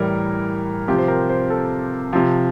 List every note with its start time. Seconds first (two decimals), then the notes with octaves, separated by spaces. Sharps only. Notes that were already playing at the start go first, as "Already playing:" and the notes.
Already playing: A2 E3 G3 A#4
0.88 C3 F3 G4
0.98 C5
1.08 A#4
1.29 C5
1.50 A4
2.13 C3 F3